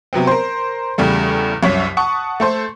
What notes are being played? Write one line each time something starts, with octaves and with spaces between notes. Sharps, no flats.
C3 F#3 B3 C4
A#4 C5
E2 C#3 G3 A3
C2 F#2 C#5 B6
F#5 A5 C#6 D#6
A3 A4 C5